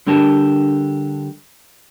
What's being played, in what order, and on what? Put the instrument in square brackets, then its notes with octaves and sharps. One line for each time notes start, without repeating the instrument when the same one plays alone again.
[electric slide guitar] D3 G3 D4 G4 A#4 A5